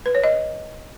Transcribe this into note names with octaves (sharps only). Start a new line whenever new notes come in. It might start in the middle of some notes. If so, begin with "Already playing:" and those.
B4
C#5
D#5